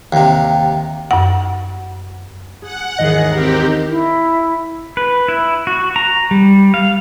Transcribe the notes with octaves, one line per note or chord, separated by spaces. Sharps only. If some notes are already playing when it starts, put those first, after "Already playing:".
D#2 C3
F#2 F#5
G#4 F#5
G#1 D#2 D#3 E3 G#4 D#5
C4 G4 A#4
E4
B4
E4
F#4
A#5
G3
F5